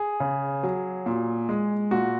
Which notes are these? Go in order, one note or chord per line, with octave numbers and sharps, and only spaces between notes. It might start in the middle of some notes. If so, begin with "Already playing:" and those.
Already playing: G#4
C#3
F#3
A#2
G#3
A#2 F#4